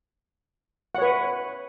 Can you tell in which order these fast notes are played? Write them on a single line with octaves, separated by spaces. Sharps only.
F#5 C#5 B4